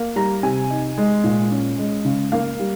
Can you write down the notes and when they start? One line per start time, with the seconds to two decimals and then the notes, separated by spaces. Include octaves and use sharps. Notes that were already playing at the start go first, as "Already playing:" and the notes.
Already playing: A#3
0.16 G3 A#5
0.43 C3 G#5
0.70 D#4
0.98 G#3
1.24 A#2
1.51 C#4
1.79 G#3
2.05 C#3
2.32 A#3 F5
2.60 G3